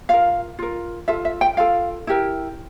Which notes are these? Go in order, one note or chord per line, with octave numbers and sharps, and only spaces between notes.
F4 A#4 F5
F4 A#4
F4 A4 E5
E5
G5
F4 A4 F5
E4 G4 A#4